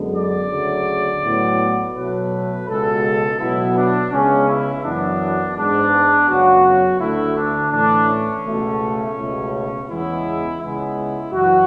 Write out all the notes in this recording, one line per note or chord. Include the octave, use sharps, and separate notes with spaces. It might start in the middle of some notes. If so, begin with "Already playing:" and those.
Already playing: F#2 D3 G#3 B3
D5
D2 C#3 F#3 A3
A2 F#3 B3
B2 F#3 A3 B4
C#2 B2 G#3 A4
B2 F#3 B3 E4
D4
C#2 C#3 G#3 B3 C#4
E4
F#2 E3 B3 D4
G#2 G#3 B3 D4
F#2 C#3 F#3 B3 F#4
D2 D3 A3 E4
D4
A2 E3 A3 D4
C#4
C#2 B2 A3
C#2 B2 A3
E2 C#3 E3 G#3 B3 E4
C#2 C#3 G#3 B3 E4
F#2 E3 F#4